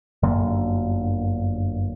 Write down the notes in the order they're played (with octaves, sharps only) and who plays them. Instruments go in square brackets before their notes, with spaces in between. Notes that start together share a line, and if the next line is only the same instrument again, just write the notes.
[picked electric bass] G1 F#2 D3 A#3